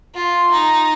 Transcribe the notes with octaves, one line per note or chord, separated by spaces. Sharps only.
F4
D#4